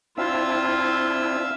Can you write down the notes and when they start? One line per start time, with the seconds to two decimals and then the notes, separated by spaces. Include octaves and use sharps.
0.18 C4 D4 E4 F4 E5 F5 E6